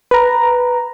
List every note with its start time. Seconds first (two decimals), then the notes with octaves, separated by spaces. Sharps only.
0.11 B4 A#5